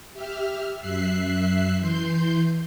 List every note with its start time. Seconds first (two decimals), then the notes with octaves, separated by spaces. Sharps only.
0.13 G4 E5 F6
0.80 F#2 E5 F#6 C7
1.80 E3 C6 G6